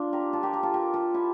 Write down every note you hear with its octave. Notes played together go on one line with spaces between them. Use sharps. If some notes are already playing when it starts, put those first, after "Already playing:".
Already playing: D4 F4
G4 A#4
F4 A4
G4 A#4
G4 A#4
F4 A4
G4 A#4
F4 A4
E4 G4